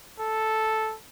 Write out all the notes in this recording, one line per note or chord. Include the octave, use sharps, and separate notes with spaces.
A4